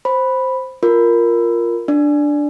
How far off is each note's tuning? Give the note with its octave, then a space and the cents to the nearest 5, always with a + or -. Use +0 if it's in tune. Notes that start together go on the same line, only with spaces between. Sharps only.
C5 +0 B5 +0
F4 +0 A#4 +0
D4 +0 D5 +0